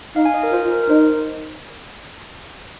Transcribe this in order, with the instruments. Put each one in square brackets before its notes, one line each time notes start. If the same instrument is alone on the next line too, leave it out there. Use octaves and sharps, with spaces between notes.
[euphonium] D#4 [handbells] F5
[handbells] G#5
D#5
A#4
[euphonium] F4 [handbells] C5
[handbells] A#4
A#4
[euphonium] D#4 [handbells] C5